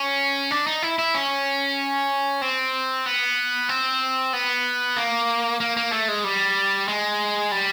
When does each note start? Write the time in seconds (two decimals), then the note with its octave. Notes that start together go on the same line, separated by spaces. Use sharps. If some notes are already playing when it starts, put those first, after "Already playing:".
Already playing: C#4
0.51 D4
0.67 D#4
0.82 E4
0.99 E4
1.14 C#4
2.42 C4
3.06 B3
3.69 C4
4.33 B3
4.97 A#3
5.60 A#3
5.77 A#3
5.92 A3
6.08 G#3
6.24 G3
6.88 G#3
7.51 G3